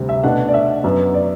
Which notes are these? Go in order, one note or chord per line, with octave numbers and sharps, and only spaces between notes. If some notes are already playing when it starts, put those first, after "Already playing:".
Already playing: D2 C3 G3
E5
B2 A3 D4 F#5
D5
E5
F#2 F#3 B3
D5